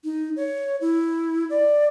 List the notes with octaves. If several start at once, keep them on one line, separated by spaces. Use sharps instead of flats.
D#4
C#5
E4
D5